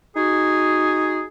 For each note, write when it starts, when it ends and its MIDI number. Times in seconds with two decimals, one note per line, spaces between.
0.15 1.24 63
0.15 1.24 66
0.15 1.24 68